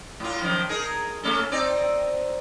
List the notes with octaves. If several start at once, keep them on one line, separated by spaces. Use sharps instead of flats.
A2 F4
F#2 D#3 F3
D#4 G#4 A#4
A3 C#4 A4
C4 D#4 D5